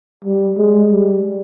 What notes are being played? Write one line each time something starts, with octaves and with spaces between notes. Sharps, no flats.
G3
G#3
G3